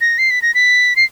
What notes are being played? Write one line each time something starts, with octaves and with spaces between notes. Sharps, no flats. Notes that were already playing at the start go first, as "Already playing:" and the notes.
A#6
C7
B6
A#6
B6
C7